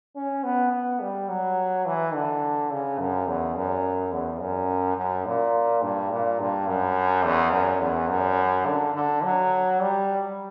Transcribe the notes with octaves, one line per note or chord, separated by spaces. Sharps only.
C#4
B3
B3
G3
F#3
E3
D3
C#3
F#2
E2
F#2
E2
F#2
F#2
A#2
G2
A#2
G2
F#2
E2
F#2
E2
F#2
D3
D3
F#3
G3